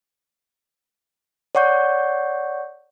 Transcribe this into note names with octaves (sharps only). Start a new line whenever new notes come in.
C#5 D5 F#5 C#6 G6